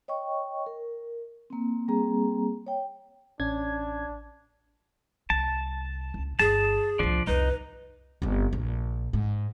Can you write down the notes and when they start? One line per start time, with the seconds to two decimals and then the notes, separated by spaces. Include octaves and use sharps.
0.08 C#5 D#5 G5 C#6
0.66 A#4
1.50 A#3 C4
1.88 G3 A#3 C4 G#4 A#5
2.67 C#5 G5
3.40 A1 C#4 D4 G#6
5.30 C2 A5
6.14 C#2
6.39 G1 E4 G#4 A5
6.99 C2 A2 F3 D4
7.27 C2 F2 D#4 B4
8.22 G1 C4
8.53 A#1
9.13 G#2